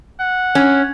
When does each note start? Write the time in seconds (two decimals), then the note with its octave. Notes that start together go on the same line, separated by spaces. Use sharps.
0.20 F#5
0.55 C#4